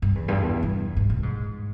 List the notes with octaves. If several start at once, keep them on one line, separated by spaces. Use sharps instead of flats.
G2
E2
G2
E2
G2
G#2
A#2
G#2